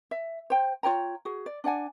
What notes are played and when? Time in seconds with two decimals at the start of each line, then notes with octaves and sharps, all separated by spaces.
0.11 E5
0.50 C5 G5
0.83 F4 C#5 G5 A#5
1.25 F#4 G#4
1.46 D5
1.64 D4 D5 F#5 G#5